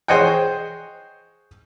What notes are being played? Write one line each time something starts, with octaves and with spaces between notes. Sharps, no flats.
G#4 C5 C#5 D#5 F#5 G5